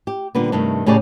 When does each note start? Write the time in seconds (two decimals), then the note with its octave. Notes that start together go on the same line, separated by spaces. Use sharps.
0.07 G4
0.35 A#2 D3 G3 B3
0.52 G2 C3 D#3 A3
0.86 A2 C#3 G4 G#4 C#5 D5